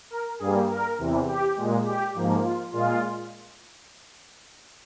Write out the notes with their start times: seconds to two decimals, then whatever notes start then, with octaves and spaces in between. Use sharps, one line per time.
0.10 A#4
0.39 G2 G3 A#3 G#4
0.69 A#4
0.98 E2 C3 E3
1.27 G4
1.56 A#2 G#3
1.85 G4
2.14 G#2 F3 A#3
2.43 F4
2.72 A#2 G#3 F4